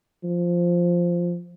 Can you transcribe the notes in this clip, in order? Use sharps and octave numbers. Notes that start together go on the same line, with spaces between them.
F3